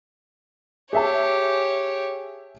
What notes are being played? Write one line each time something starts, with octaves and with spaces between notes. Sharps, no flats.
G4 G#4 C#5 E5 A5